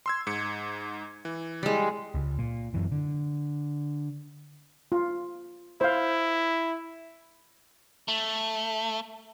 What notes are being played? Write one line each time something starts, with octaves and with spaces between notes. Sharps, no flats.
C6 E6 G#6
G#2 C#7
E3
G3 G#3
C#2
A#2
F#2 E3
D3
F4
E4 C5 F5
A3